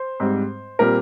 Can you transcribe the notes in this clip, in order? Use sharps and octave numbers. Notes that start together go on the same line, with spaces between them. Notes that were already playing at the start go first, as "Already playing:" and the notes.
Already playing: C5
G#2 G3 C4
A#2 G3 C4 A#4